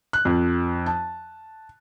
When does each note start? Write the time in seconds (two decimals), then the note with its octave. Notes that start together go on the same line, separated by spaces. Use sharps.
0.13 F#6
0.25 F2
0.86 A5